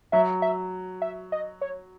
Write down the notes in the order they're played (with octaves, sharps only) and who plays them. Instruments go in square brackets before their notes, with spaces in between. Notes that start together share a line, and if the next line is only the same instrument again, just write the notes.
[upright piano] F#3 [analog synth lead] E5
[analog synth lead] E5
E5
D#5
C#5